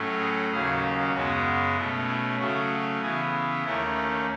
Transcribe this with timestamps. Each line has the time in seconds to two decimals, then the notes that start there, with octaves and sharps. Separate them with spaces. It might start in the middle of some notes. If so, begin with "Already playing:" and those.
Already playing: A2 F#3 A3 C#4
0.19 G#4
0.51 D#2 C#3 F#3 C#4 G#4
1.13 F#2 C#3 G#3 B3 F#4
1.75 B2 A3 C#4 E4
2.07 E4
2.38 C#3 F#3 A3 C#4 F#4
3.01 C#3 E3 B3 G#4
3.64 D#2 D#3 A3 C#4 E4